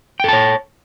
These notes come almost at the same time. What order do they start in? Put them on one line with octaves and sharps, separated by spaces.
G5 A4 A5 C#5